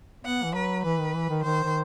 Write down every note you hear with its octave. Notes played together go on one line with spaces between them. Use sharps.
B3 F#5
E3
F#3 B4
E3 B4
D#3
E3
D#3
D#3 C5
D#3